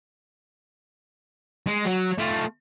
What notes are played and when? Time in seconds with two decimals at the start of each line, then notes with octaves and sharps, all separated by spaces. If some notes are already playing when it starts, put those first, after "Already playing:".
1.67 G#3
1.85 F#3
2.18 A3 F4